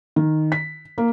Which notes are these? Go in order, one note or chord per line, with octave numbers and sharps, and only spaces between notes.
D#3
B6
A#3